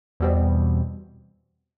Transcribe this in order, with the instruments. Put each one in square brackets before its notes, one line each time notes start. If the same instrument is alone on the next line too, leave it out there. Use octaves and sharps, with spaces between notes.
[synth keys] E2 B2 G3 C4